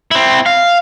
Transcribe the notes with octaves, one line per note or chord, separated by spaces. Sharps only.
C4 E4
F5